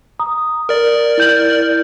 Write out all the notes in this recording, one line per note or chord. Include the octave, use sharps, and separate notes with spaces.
A#5 D#6
A#4 D5
E4 G6 F#7